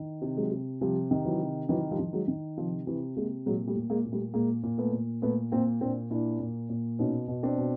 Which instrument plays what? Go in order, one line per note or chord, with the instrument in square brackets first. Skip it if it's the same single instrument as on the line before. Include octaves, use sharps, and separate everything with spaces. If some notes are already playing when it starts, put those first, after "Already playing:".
Already playing: [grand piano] D#3
C3
F#3 G#3
C3
C3 F3 G3
D#3
E3 F#3
C3
D#3 E3 F#3
F3 G3
D#3
F#3 G#3
D#3
C3 F3
C3 E3
C3 G#3 A#3
A#2 F#3 G#3
G3 A3
A#2
G#3 A#3
A#2
G3 A3
A#2 G#3 A#3
A#2
A3 B3
A#2
A#2 A3 B3
A#2 A#3 C4
A#2 C4 D4
A#2 D4 E4
A#2
A#2
B2 C#4 D#4
B2
C4 D4
B2